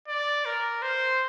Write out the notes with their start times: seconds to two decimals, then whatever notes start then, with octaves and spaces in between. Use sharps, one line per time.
0.08 D5
0.45 A#4
0.82 C5